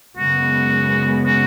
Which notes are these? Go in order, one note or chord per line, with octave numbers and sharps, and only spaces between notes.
F#2 C#3 G#3 B3 F#4
F#4